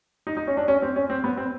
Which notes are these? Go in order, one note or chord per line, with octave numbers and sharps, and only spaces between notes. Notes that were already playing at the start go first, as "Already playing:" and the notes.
D#4
D#4
C#4
D4
C#4
C4
C#4
C4
B3
C4